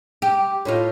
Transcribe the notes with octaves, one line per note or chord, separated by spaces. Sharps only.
G4
A2 D#4 F4